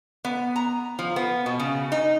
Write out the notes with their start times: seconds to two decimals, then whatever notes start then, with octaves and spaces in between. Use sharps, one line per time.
0.25 B3
0.56 A#5
0.99 F3
1.16 B3
1.46 B2
1.60 C#3
1.92 D#4